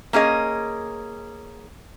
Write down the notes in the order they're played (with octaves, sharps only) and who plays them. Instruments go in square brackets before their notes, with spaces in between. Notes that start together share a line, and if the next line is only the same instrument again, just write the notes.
[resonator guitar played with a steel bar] A#3 C#4 G#4 D#5